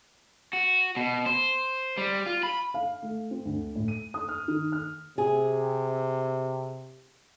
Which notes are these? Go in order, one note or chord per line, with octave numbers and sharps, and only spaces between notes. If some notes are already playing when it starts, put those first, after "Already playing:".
F#4
B2
C5
G3
F4
B5
F5
A3
C4
D2
A2
D#7
D#6
F6
D#3
F6
C3 G#4